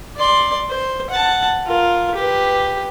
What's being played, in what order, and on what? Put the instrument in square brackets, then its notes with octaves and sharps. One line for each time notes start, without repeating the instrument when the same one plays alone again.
[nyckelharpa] D5 C6
C5
F#5 A5
F4 A#4
G4 B4